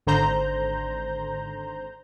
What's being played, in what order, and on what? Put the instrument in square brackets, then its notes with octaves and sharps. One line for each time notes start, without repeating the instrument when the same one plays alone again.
[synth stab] G#1 D3 C5 A#5 G6